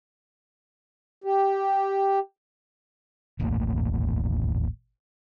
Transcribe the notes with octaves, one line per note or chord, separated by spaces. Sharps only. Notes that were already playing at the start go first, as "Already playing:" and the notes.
G4
D#1 A1 A3 A#3